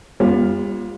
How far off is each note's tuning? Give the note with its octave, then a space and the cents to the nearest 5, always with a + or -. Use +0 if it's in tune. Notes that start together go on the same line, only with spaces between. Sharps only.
G3 +35 B3 -35 F4 +0